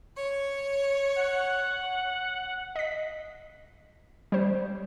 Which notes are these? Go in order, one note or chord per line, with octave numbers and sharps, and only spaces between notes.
C#5
F#5
D#5 B6
G3 C5